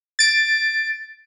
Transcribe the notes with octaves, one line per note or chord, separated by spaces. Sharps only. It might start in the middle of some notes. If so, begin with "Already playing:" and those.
A6 D7